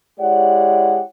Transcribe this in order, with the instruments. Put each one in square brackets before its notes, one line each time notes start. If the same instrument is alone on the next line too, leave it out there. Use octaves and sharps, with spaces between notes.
[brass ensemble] G#3 E4 G4 C#5 D5 F#5